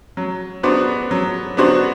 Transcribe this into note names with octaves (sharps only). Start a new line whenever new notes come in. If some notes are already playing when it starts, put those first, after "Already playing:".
F#3
B3 D4 F#4 C5
F#3
B3 D4 F#4 C5